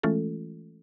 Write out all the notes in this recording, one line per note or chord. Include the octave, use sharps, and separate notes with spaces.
E3 G#3 A3 C#4 F4 A4